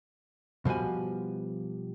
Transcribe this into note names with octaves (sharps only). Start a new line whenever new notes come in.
B2 F3 G3 F#4 G#5